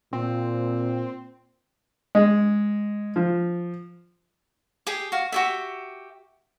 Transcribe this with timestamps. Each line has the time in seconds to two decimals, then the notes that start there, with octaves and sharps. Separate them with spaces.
0.13 A#2 C4
2.15 G#3
3.16 F3
4.87 G4 G#4
5.12 F#4 F5
5.32 F#4 G4 E5